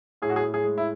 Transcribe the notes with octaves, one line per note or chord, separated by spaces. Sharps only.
A2 G#4
F#4
G#4
A2
G#4
G#3
E4